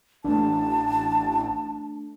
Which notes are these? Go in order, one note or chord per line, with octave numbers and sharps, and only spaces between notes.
A1 A3 D4 A5